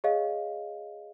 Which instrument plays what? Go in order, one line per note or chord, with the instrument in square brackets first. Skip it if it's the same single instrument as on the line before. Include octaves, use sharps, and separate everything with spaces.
[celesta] G#4 C#5 D#5 F5